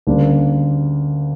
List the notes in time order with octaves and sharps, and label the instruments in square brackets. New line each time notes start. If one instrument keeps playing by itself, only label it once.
[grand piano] D2 C#3 G3 A#3 D4